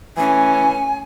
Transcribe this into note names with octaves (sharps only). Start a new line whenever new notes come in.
E3 A3 C#4 G#5